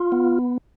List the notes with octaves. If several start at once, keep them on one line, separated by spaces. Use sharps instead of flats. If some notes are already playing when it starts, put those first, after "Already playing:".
Already playing: F4
B3